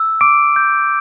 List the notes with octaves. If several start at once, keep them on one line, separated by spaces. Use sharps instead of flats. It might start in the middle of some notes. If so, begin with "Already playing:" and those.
Already playing: E6
D6 D7
G6